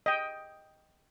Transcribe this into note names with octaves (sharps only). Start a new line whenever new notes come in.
D#5 G5